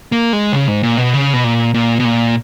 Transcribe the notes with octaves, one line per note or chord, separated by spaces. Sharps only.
A#3
G#3
C#3
G#2
A#2
B2
C#3
B2
A#2
A#2
B2
A#2